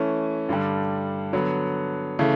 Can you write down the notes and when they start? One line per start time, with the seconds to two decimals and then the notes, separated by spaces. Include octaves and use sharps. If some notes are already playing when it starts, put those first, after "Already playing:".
Already playing: E3 A3 C#4
0.49 G2 D3 G3
1.33 D3 F#3 B3
2.19 C#3 E3 A3